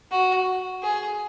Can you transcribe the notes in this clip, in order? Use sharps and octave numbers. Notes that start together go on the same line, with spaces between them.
F#4
G#4